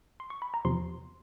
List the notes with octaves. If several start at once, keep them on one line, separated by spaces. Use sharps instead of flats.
C6
C#6
B5
A#5
E2 C3 F3 C6